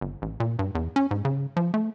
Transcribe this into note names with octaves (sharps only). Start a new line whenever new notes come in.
G1
A1
A#2
G2
E2
C#4
G#2
C#3
F3
A3